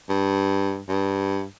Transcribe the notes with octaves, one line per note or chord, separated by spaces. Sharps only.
G2
G2